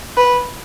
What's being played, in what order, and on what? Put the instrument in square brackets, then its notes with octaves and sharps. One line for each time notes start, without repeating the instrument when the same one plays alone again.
[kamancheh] B4